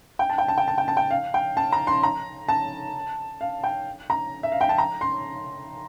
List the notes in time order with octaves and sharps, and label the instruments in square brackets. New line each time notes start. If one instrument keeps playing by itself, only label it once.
[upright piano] G5
A5
G5
A5
G5
A5
G5
A5
G5
F5
G5
A5
A#5
C6
A#5
A5
F5
G5
A#5
E5
F5
G5
A5
A#5
C6